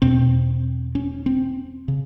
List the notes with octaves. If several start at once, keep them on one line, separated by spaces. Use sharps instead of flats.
E2 B2 C4
C#4
C4
C#3